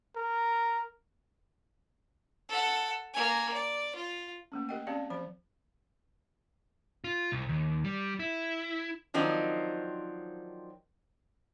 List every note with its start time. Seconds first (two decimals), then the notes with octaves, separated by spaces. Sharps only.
0.16 A#4
2.49 A4 F#5
3.14 A#3 G#5
3.53 D5
3.95 F4
4.52 A3 A#3 C#4
4.69 G4 A#4 D#5 F#5 G5
4.87 C4 C#4 G4 D5 F5 A5
5.10 F3 C5 B5
7.04 F4
7.32 C2
7.49 D#2
7.84 G3
8.19 E4
9.14 D#3 F3 F#3 C4 D4 D#4